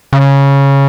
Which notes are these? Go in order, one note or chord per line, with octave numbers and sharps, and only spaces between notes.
C#3